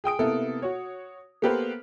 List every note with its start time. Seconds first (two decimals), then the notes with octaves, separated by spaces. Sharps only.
0.04 G#4 G5 D#6 D7
0.19 C3 A#3 B3 E4 A4
0.62 F#4 C#5
1.42 A#3 B3 G4 A4 B4 C5